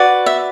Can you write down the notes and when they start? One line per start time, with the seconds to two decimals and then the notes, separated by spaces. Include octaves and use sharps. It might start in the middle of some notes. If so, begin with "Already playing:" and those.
Already playing: F#4 B4 D5
0.26 E5